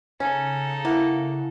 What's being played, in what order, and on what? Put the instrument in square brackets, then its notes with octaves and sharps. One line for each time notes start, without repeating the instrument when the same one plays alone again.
[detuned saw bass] C#3 [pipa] C#4 [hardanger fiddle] D#4 A4
[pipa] A#3 [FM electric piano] E4 F#5